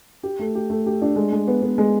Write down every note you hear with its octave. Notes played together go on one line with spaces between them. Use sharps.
G4
A3
G4
A3
G4
D4
G#3
G#3
B3
B3
G#3